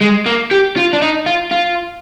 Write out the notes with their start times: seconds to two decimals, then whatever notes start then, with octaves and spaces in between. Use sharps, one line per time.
0.01 G#3
0.26 A#3
0.51 G4
0.76 F4
0.93 D4
1.02 D#4
1.26 F4
1.51 F4